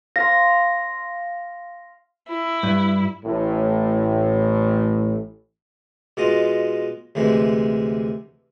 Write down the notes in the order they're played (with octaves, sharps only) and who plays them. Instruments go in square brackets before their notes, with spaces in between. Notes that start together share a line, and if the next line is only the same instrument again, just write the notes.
[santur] F5 C6 [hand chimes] A#6
[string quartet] E4
[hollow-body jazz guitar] G2
[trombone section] A1 A2
[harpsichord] B2 G#3 F4 D#5
D2 C3 E3 G#3